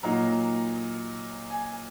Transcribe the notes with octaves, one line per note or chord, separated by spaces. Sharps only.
A#2 F#3 A#3 D#4 A#5
G#5